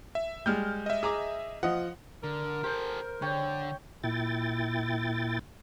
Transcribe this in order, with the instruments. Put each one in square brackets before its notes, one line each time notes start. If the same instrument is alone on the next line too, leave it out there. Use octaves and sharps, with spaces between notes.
[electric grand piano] E5
[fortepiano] G3 G#3 [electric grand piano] F6 G6
[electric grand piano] D#5 E5
[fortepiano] G#4 A#5 D6
[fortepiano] F3 D#5 [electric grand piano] F#5
[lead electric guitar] D3 [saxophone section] A#4
[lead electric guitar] G4 A4 [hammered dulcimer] C5
[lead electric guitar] D3 [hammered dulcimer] C#5 G5
[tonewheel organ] A#2 E4 G5 A6